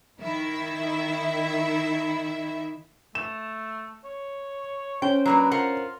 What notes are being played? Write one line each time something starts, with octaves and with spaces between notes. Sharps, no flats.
D#3 E4 E5
A3 E7
C#5
C#4 C5 G5
F#3 A#3 D4 B4
F4 A#4 C5 F#5